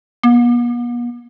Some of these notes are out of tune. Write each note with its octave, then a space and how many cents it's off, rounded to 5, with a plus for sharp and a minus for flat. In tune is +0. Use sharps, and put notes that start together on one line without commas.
B3 -45